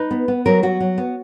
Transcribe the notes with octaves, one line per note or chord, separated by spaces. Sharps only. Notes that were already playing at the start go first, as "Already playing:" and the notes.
Already playing: D#4 B4
B3
B3
F#3 A#4
F#3 F#4
F#3
B3